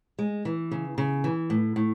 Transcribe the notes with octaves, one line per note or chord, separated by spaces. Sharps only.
G#3
E3
C#3
C#3
E3
A2
A2